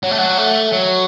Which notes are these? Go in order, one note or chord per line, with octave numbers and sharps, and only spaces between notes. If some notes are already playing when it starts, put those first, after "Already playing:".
F#3
A3
F#3
A3
F#3